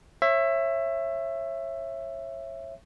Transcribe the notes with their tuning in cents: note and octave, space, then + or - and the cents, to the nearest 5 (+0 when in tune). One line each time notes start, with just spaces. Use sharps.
C#5 -30 E5 +15